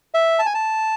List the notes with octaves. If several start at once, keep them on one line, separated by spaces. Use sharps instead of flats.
E5
A5
G#5
A5